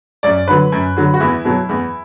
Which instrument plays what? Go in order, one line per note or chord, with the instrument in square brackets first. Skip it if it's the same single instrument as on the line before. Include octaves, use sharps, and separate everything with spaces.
[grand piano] F#2 D5
D3 F#3 B4
F#2
D3 F#3
F#4
E2 E4
B2 F#3
E2